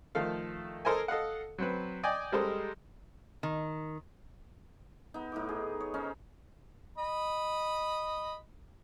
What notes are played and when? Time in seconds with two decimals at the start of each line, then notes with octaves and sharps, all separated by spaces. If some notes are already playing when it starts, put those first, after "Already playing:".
0.15 D#3 F3 A3 A4 F5
0.85 A4 A#4 C5 D#5 G#5
1.08 A4 D#5 F5 F#5
1.58 F#3 C4 B4
2.03 D5 D#5 G5 G#5 D6
2.32 G3 G#3 A4 A#4 C5 D#5
3.43 D#3
5.14 B3 D#4
5.32 A2 D#4 D6
5.49 G#4
5.80 C#5
5.94 C#4 D#4 C5
6.98 D#5 B5